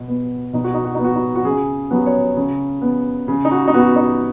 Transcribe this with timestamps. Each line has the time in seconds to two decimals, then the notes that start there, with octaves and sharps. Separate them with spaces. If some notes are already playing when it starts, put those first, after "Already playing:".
Already playing: B2
0.08 B3
0.53 B2 D#4
0.64 F#4
0.74 D#4
0.85 F#4
0.95 B3 D#4
1.05 F#4
1.15 D#4
1.36 F#4
1.45 C#3 G#4
1.91 F#3 B3
2.06 C#5
2.36 C#3
2.82 B3
3.28 C#3
3.45 D#4
3.51 F#4
3.68 D#4
3.74 B3 F#4
3.96 D#4